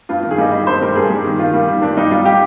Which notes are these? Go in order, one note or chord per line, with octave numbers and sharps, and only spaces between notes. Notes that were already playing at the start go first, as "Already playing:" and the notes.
G2 F4
D#3 F4
G#4
G3 D#5
D#3 D#5
G2 C5
G3 A#4
G2 G#4
G3
D#3
D#3 F4
G3
D#3
G2 D4
G3 D#4
G3 F4
G4